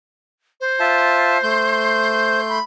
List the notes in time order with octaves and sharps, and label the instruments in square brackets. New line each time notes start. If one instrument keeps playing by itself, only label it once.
[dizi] C5
[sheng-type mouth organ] F4 E5 A5
A3 C6 G6
[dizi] B5